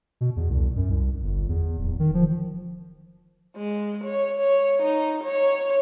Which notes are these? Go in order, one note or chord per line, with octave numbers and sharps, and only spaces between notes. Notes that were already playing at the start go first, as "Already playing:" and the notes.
B2
E2
C2
F#2
C2
G1
E2
D1
D#3
F3
G#3
C#5
C#5
D#4
C#5